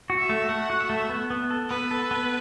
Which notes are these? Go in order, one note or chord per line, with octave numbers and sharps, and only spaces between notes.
F#4
E5
A3
A3 F#5
F#4
E5
A3
B3
B3
A4
B3 B4
A4
B3